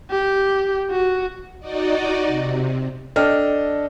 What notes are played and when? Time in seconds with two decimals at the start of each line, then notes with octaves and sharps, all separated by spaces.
0.11 G4
0.91 F#4
1.60 D#4 F#4 D5 D#5
2.27 C3
3.16 D4 A4 D#5 G5 F6